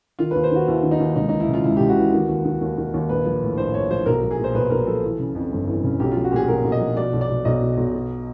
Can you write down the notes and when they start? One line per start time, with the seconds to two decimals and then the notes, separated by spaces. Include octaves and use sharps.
0.19 D#3 F4
0.31 D#2 B4
0.44 C5
0.52 D#3 F#4
0.68 D#2 E4
0.83 D#3
0.91 D#4
1.00 D#2
1.16 C#2 D#4
1.29 E3 D#4
1.40 E4
1.48 C#3
1.54 F4
1.64 C#2 E4
1.77 C#2 G4
1.89 F#4
1.97 E3
2.13 D#3
2.29 D#2
2.45 D#3
2.61 D#2
2.77 D#3
2.94 D#2
3.09 A#1 B4
3.26 F3
3.42 A2
3.58 A#1 C5
3.74 A#1 C#5
3.91 F3 C5
4.06 B1 A#4
4.23 F3
4.31 G#4
4.39 A#2 C5
4.54 B1 B4
4.70 B1 A#4
4.87 F3 A4
5.04 E3
5.19 C#3
5.35 F2
5.52 G1
5.67 E3
5.84 C#3
6.00 B1 G4
6.11 F3 F4
6.24 F#4
6.31 A#2 G4 G#4
6.48 B1 A#4
6.64 B1
6.72 D#5
6.80 F3
6.97 B2 D5
7.13 B1
7.21 D5
7.29 B2
7.45 B1 D#5
7.61 B2
7.77 B1
7.94 B2